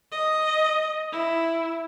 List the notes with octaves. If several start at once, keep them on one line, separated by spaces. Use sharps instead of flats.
D#5
E4